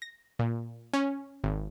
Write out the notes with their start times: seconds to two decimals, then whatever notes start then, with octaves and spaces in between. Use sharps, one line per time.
0.02 A#6
0.39 A#2
0.94 C#4
1.44 G#1